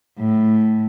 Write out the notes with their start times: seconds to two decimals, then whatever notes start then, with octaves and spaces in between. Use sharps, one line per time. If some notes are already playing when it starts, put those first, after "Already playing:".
0.19 A2